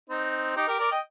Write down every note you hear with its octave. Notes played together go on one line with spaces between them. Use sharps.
C4 D#4
D#4 G4
G4 A#4
A#4 D5
D#5 G5